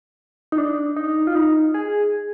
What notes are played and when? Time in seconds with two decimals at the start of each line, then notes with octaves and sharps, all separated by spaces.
0.52 D#4
0.58 D4
0.96 D#4
1.27 F4
1.35 D#4
1.74 G#4